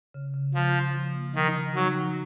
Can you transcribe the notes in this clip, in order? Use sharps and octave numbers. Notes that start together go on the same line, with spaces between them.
C#3
C#3
C#3 F3
C#3
F3
A#3
D#3 F3
C#3
F#3 D#4
F3